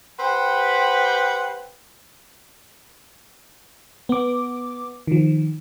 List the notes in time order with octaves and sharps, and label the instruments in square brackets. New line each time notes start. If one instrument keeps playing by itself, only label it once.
[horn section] G4 B4 C5 F#5 G5
[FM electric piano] B3 D6
D#3 F3